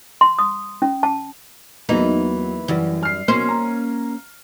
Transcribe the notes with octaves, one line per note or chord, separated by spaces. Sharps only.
C6
D#6
C#4
A5
E2 E3 F#3 A#3 D#4
F#2 E3 G3
F6 C7
B1 A#3 C#4 C5
A#5